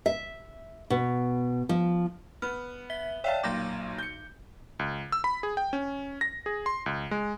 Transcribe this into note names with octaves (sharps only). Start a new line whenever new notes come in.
E5
B2
F3
B3 F6
E5 B6 G7
C#5 D5 E5 F5 G5 A5
B1 A#2 D6 G6 A#6
G6 C#7
C#2
E6
B5
G#4
G5
C#4
A#6
G#4
C6
C#2
G#3